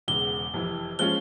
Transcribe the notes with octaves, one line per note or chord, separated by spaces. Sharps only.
E1 E2 C#3 G7
F1 F2 E3
F3 G#3 C#4 F4 G7